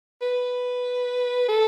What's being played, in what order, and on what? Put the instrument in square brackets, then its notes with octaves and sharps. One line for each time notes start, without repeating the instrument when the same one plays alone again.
[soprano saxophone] B4
A4